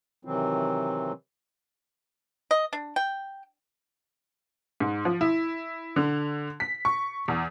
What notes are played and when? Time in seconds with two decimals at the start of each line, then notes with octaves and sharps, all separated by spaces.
0.25 C3 D#3 E3 F#3 C4
2.51 D#5
2.73 D4
2.96 G5
4.80 G#2
5.05 F3
5.21 E4
5.96 D3
6.60 B6
6.85 C#6
7.28 E2